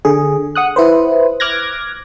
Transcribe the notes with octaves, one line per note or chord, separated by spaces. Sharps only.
D3 G#4
F#5 D#6 F#6
E4 B4 C5
D6 F6 F#6 G#6 A#6